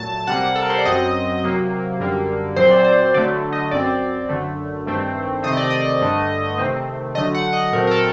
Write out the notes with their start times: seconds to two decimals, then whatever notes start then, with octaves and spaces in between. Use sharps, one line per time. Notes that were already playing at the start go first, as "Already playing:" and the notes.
Already playing: A#2 F#3 A3 A5
0.27 C3 G3 A#3 F#5
0.56 A4
0.62 A#4
0.70 C5
0.78 D5
0.85 F#2 F#3 C4 D#5
1.43 C3 F#3 A#3
2.00 F#2 D3 G3 A#3
2.56 A#2 F#3 C4 C5
2.71 D5
2.84 C5
3.14 D3 F#3 A3 D5
3.53 D#5
3.71 F#2 F#3 C4 D5
4.29 F#2 D3 A3
4.86 G2 D#3 A3 C4
5.43 C3 D#3 A3 C4 D#5
5.57 D5
5.70 D#5
6.01 G2 D3 A3
6.58 C3 D#3 A3 C4
7.15 D3 F#3 A3 D#5
7.35 F#5
7.53 D#5
7.73 A#2 F#3 A3 C4 A#4
7.87 A#4
7.91 A4